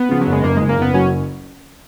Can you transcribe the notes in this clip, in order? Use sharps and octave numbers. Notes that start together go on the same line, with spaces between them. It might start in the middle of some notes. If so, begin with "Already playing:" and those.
Already playing: B3
C#3 F3
F#3
F#1
G#3
F#1 A#3
F#1 G#3
A#3
F#1 B3
F#3 C#4